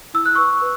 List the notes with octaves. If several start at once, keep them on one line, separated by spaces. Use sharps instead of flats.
E4 E6
F#6
B4 C#6 E6
B4